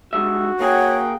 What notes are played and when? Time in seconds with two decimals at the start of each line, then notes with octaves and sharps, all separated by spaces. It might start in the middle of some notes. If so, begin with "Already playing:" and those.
0.13 G2 G#3 F#4 E5
0.60 A#3 G#4 C#5 F#5 G5